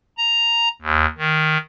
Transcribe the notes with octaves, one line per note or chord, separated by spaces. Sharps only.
A#5
D#2
D#3